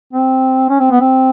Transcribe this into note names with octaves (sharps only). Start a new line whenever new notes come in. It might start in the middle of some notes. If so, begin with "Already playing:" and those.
C4
C#4
C4
B3
C4